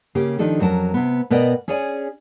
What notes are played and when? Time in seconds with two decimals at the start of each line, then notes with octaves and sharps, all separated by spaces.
0.15 C#3 A#3 G4
0.39 D#3 F3 D4 D#4 A4
0.59 F2 F#3 C#4 A#4 A5
0.94 C3 B3
1.30 B2 B3 A#4 D5 D#5 G5
1.68 C#4 G#4 C#5 D5 G#5